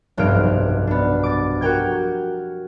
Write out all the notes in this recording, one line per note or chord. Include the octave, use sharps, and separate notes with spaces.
F1 B1 G2 C4 F6 D7
B3 D4
D6 A6
F#4 G4 A#4 G5 G#6